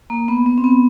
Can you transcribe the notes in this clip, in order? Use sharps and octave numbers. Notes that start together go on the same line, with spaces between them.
A#3
B3
B3
C4
B3